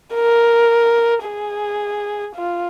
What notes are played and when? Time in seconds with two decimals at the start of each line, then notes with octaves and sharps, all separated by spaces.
0.14 A#4
1.25 G#4
2.36 F4